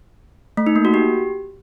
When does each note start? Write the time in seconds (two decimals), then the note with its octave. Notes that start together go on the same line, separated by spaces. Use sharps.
0.57 A3
0.67 D#4
0.76 A#3
0.85 F#4
0.94 G4